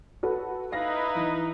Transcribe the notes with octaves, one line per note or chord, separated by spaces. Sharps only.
F#4 A4 B4
D#4 E4 B4 F5 A#6
E3